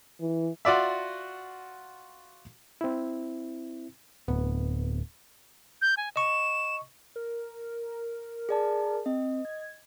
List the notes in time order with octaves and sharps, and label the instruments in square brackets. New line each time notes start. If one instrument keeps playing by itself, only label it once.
[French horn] E3
[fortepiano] F4 F#4 D5 E5
[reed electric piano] C4 E4
[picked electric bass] D1 [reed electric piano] B3
[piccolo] G6
G#5
[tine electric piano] D#5 C#6 [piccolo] E7
[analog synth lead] A#4
[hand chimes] G#4 D5 A5
[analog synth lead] C4 [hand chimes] D#5
[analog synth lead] G#6